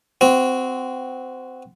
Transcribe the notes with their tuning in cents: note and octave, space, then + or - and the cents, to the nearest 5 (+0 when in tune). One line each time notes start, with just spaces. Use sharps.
C4 -20 F#4 +0